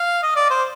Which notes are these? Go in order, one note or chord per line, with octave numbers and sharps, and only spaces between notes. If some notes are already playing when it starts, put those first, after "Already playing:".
Already playing: F5
D#5
D5
C5